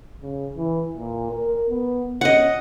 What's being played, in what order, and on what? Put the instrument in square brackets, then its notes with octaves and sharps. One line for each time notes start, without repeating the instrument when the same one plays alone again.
[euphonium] C#3
E3
A#2
A#4
B3
[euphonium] C#4 [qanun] D#5 F#5